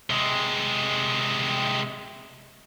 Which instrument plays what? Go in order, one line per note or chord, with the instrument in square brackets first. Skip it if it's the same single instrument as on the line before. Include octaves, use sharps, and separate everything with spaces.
[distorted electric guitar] C3 G#3